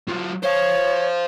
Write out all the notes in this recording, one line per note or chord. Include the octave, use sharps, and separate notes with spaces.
F#3 F4
C5 C#5 F5